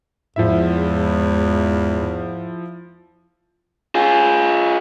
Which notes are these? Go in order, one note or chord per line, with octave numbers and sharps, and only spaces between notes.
E2 G#2 F3 E4 E5
F4 G#4